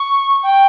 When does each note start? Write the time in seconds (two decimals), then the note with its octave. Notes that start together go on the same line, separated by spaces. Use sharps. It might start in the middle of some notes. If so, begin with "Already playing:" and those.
Already playing: C#6
0.43 G5